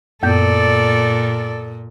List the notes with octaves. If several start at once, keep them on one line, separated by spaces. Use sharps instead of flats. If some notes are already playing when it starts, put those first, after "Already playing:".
F#2 A#2 B3 A4 D5 G6